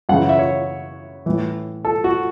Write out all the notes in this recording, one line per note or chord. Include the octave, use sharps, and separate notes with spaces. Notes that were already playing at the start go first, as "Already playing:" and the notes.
F#2 C#3 E3 F#5
E5
C#5
A2 E3
A4
F#4